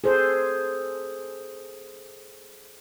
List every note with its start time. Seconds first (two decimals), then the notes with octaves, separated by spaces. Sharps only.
0.04 G#4 A4 C5